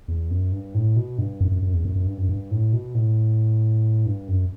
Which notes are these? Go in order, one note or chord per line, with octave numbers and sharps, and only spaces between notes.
E2
F#2
G2
A2
B2
G2
F#2
F#2
F#2
E2
F#2
F#2
G2
F#2
G2
A2
B2
A2
G2
F#2